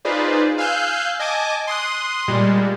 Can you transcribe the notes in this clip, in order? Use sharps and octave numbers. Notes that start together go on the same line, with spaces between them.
D#4 F4 G#4 B4 C5 D5
F5 G#5 E6 F#6 G6
D#5 G#5 A5 D6
C6 D#6 F#6
A#2 G3 G#3